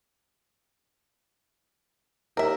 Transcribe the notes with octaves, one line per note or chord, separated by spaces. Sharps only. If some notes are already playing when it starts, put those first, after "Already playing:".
D#2 A#4 E5